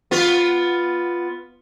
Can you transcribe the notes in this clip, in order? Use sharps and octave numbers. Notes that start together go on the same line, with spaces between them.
B3 F4